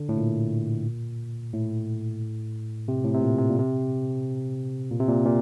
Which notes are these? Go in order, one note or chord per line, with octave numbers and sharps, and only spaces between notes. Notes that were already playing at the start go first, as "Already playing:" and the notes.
Already playing: D3
A2
A#2
A2
C3
A2
C3
A#2
C3
A#2
C3
A#2
C3
A#2
A#2